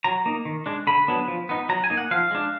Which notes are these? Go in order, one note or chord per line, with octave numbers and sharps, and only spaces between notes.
F#3 A#5
A#3 D#4
D#3
G#3 D4
D3 B5
F#3 B3 D4
F3
B3 D#4
F#3 A#5
G#5
A#3 D#4
F#5
F3 F5
G#3 D4